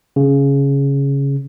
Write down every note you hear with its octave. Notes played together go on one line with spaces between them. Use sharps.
C#3